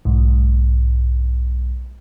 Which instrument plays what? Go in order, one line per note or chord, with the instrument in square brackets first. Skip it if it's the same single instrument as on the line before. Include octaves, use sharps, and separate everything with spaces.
[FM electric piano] B1 G#2